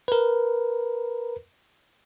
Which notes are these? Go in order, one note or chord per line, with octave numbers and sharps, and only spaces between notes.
A#4 B4